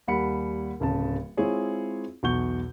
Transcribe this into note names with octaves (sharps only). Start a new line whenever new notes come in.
D#2 G3 A#4 F#5 B5 C#7
D1 C#3 A5
G#3 C4 E4 F4 G#4 C#5
B1 E2 F#4 C#6 G6 G7